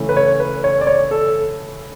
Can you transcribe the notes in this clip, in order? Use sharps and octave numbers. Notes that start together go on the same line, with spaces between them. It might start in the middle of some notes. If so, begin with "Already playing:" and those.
Already playing: C#3 E3 A3 C#4
B4
C#5
B4
C#5
D5
C#5
A4